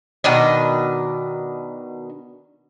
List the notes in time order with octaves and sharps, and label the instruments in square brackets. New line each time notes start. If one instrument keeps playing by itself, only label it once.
[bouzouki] B2 D#3 D4 D#5